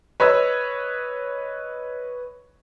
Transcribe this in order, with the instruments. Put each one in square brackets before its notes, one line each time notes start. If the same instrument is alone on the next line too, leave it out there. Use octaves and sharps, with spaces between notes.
[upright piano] B4 C#5 D#5 B5 E6